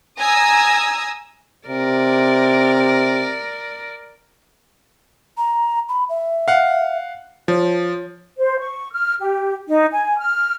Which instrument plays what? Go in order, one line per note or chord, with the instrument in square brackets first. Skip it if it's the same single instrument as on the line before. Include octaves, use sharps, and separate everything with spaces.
[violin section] G#5 A#5 D#6 E6 G#6
[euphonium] C3 [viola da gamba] A#4 D5
[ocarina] A#5
B5
E5
[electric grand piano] F5 F#5
[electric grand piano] F3 [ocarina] C#5
[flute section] C5
C#6
F6
G4
D#4
G#5
F6